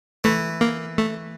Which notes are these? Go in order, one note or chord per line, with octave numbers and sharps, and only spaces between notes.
E3 A3
A#3
A3